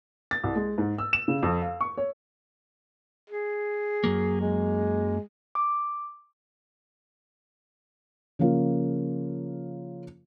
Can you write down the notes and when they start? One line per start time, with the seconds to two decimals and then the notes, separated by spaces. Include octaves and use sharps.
0.31 A6
0.44 C2
0.56 G#3
0.78 G#2
0.98 E6
1.13 E7
1.28 C#3
1.43 F2
1.62 F5
1.81 C#6
1.98 C#5
3.30 G#4
4.04 F#2 F#3 A#3
4.41 G#3
5.55 D6
8.39 C#3 F3 A#3 F4